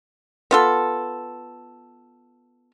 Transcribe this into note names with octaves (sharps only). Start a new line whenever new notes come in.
B3 F4 A4